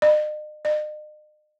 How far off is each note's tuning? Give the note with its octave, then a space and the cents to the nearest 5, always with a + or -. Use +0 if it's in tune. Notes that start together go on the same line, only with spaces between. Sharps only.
D#5 -45
D#5 -45